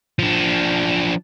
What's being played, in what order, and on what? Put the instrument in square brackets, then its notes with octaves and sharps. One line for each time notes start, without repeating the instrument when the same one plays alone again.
[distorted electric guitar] F3 D4